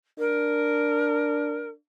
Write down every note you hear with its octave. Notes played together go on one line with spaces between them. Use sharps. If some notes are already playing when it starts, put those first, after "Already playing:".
D4 A#4